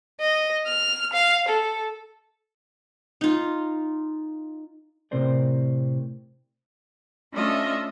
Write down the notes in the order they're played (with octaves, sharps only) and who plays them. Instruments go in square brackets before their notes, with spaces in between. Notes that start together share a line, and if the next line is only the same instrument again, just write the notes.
[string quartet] D#5
F6
F5
A4
[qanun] D#4 F4
[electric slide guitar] A2 C3 C4 A#4 C5 D5
[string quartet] A3 C#4 D4 F4 D#5 E5